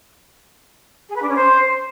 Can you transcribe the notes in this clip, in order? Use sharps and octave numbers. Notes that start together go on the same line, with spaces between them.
G#4
B4
D4
C#4
C5